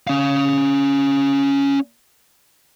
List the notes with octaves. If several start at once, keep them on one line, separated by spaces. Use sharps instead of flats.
C#4 F5